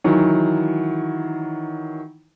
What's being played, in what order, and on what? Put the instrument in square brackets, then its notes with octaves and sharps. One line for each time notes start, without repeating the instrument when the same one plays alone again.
[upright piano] D#3 E3 F#3